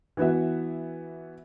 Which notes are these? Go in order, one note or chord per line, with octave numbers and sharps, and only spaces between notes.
E3 B3 F#4 E5